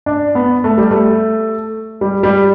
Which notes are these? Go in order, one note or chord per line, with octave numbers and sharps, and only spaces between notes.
D4
B3
A3
G3
A3
G3
G3